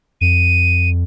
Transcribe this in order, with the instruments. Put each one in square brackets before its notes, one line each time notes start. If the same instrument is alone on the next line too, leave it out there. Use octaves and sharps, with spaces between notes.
[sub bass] F2 [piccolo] D#7